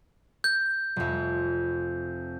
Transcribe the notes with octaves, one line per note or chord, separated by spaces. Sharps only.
G6
F1 F2